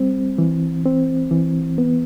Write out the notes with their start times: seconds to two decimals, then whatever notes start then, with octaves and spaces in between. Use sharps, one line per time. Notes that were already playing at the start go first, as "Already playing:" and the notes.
Already playing: G3 C4
0.38 E3
0.85 C4
1.31 E3
1.78 B3